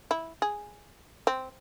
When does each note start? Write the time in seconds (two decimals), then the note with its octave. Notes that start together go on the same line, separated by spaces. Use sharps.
0.11 E4
0.42 G#4
1.27 C4